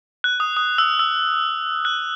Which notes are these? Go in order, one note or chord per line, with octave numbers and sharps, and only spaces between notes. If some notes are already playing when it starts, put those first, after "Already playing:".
F#6
D#6
D#6
E6
E6
F#6